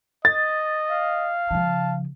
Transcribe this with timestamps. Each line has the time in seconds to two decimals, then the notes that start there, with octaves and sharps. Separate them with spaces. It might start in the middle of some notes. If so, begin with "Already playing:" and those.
0.25 D#5 A6
0.91 F5
1.51 C#3 F3 A5